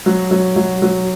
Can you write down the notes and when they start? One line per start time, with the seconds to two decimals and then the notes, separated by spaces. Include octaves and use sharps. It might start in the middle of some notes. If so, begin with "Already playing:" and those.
0.06 F#3
0.31 F#3
0.56 F#3
0.82 F#3